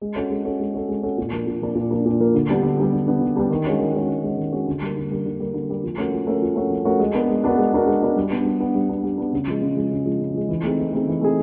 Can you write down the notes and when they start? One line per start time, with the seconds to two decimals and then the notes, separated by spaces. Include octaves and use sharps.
0.01 G#3
0.16 C#4 F#4 A4
0.30 G#3
0.45 C#4 F#4 A4
0.60 G#3
0.74 C#4 F#4 A4
0.89 G#3
1.03 C#4 F#4 A4
1.18 A#2
1.32 F3 A#3 D4
1.47 A#2
1.62 F3 A#3 D4
1.75 A#2
1.91 F3 A#3 D4
2.05 A#2
2.20 F3 A#3 D4
2.34 D3
2.49 G3 B3 D4 G4
2.63 D3
2.78 G3 B3 D4 G4
2.93 D3
3.07 G3 B3 D4 G4
3.22 D3
3.36 G3 B3 D4 G4
3.50 D#3
3.66 G#3 C#4 F#4
3.80 D#3
3.94 G#3 C#4 F#4
4.09 D#3
4.23 G#3 C#4 F#4
4.37 D#3
4.52 G#3 C#4 F#4
4.67 D3
4.82 G3 A#3
4.96 D3
5.11 G3 A#3
5.26 D3
5.40 G3 A#3
5.54 D3
5.69 G3 A#3
5.84 F3
5.97 A3 C#4 F#4 A#4
6.13 F3
6.27 A3 C#4 F#4 A#4
6.42 F3
6.56 A3 C#4 F#4 A#4
6.70 F3
6.85 A3 C#4 F#4 A#4
6.99 G#3
7.14 B3 D4 F#4 A#4
7.29 G#3
7.44 B3 D4 F#4 A#4
7.58 G#3
7.73 B3 D4 F#4 A#4
7.87 G#3
8.02 B3 D4 F#4 A#4
8.17 G3
8.31 B3 D4
8.45 G3
8.60 B3 D4
8.75 G3
8.89 B3 D4
9.04 G3
9.18 B3 D4
9.33 C#3
9.47 F3 G#3
9.61 C#3
9.76 F3 G#3
9.91 C#3
10.05 F3 G#3
10.21 C#3
10.34 F3 G#3
10.49 E3
10.63 A3 C4 D#4 G#4
10.78 E3
10.93 A3 C4 D#4 G#4
11.07 E3
11.21 A3 C4 D#4 G#4